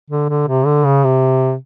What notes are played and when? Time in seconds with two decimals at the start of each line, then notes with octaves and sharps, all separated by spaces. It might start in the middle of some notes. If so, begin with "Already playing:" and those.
0.10 D3
0.29 D3
0.48 C3
0.66 D3
0.84 C#3
1.04 C3